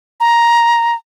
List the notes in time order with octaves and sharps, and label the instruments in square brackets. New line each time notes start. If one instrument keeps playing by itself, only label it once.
[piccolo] A#5